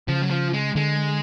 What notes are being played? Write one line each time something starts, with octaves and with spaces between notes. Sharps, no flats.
C#3 F3
F#3
F3
G#3
D3 G#3